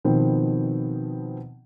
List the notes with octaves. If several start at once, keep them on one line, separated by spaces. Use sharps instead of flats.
B2 D#3 F3 B3 C4